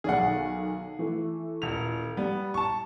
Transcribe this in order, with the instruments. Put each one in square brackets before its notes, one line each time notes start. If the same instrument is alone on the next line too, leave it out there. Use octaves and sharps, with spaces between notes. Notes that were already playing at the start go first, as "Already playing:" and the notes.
[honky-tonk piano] B1 D#3 [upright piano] G#4 D5 F#5
[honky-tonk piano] E3 A3
[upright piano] D#1 F7
[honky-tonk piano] G3 [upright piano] B3
[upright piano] A5 C#6